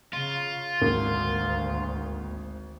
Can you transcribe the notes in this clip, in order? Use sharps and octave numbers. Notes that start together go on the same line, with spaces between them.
C#3 F4
G#1 D2 A#3